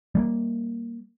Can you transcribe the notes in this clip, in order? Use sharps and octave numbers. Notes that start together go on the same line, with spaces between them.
G3 G#3 A#3